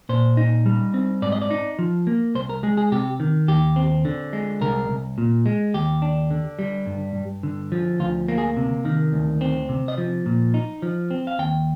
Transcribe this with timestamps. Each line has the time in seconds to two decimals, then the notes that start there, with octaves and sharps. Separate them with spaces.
0.09 A#2 C5
0.37 D#4
0.66 G3
0.94 C4
1.22 G#2 D5
1.32 D#5
1.42 D5
1.51 D#4
1.79 F3
2.07 A#3
2.35 C2 C5
2.49 A#4
2.63 G#3 G#4
2.77 G#4
2.92 C3 G4
3.20 D#3
3.48 D#2 G4
3.76 C4
4.05 D3
4.33 G#3
4.61 C2 A#4
4.89 C2
5.18 A#2
5.46 G#3
5.74 D#2 G4
6.02 D4
6.30 D3
6.59 G3
6.86 G2
7.15 G2
7.43 D3
7.72 F3
8.00 D2 F4
8.29 A#3
8.38 G#4
8.57 C3
8.85 D#3
9.13 D2
9.41 C4
9.69 C3
9.88 D#5
9.98 F3
10.26 A#2
10.54 D#4
10.82 F3
11.11 C4
11.27 F5
11.39 D#2 G5